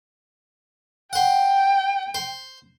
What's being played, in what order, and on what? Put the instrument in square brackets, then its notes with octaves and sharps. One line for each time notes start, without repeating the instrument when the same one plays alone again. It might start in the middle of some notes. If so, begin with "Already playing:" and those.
[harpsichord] C5 F#5 [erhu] G5
[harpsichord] C5